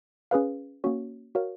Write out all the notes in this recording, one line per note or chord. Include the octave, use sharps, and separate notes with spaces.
C#4 G#4 B4 F5
A#3 C#4 F#4 C#5
F#4 A#4 C#5 F5